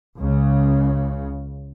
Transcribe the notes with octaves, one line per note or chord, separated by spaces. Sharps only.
C#2 C#3